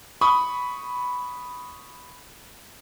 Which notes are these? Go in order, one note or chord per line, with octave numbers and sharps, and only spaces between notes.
B5 C#6 D#6